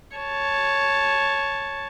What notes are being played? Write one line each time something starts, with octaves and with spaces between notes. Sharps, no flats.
C#5 A5